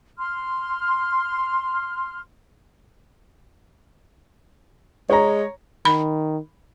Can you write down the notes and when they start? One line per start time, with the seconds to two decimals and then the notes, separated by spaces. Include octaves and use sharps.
0.18 C6 F6
5.10 G#3 C#5 A#5
5.85 D#3 B5